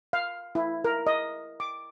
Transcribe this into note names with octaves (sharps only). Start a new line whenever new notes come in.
F5
E4
A#4
D#5
D6